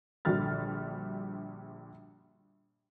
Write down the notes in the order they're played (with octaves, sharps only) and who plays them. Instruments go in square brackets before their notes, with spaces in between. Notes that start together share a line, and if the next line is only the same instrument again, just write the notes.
[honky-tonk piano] A#1 D3 G3 F#4 F6 A6